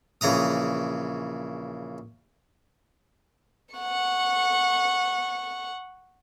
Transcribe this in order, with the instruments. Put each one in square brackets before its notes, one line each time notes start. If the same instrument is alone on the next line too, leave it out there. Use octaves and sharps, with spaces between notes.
[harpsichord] A#1 C#3 E3 A#5 D#6
[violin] F#5 C#6